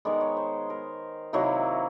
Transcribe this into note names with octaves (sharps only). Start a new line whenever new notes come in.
D#3 G#3 B3 D5
C#5
C5
A#4
C3 D#3 F#3 A#3 E4